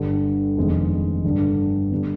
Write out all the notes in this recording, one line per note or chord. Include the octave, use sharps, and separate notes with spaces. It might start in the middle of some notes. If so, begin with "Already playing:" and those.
Already playing: G1 G2 D3 G3
F1 F2 D#3 G#3 B3
G1 G2 D3
D3 G3 B3